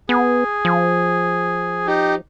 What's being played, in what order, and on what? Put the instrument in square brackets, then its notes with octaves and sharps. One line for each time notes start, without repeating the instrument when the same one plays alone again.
[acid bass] B3 [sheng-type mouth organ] G#4
[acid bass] F3
[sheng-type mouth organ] D#4 G4